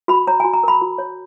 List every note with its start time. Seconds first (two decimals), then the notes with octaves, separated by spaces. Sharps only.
0.08 F#4 B5
0.27 C#5 A#5
0.40 G#5
0.44 F#4
0.53 A#5
0.63 A#4 B5
0.82 F#4
0.98 C#5